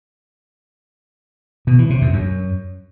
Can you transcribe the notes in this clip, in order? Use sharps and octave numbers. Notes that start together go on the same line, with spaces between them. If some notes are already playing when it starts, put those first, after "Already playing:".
B2
E3
C3
F2
F#2